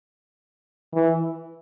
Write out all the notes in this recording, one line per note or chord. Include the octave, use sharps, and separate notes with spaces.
E3